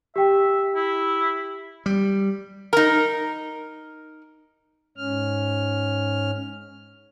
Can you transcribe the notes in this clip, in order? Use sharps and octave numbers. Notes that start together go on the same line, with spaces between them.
G4 E5 G5
E4
G3
D#4 A#4
G#2 C#4 F6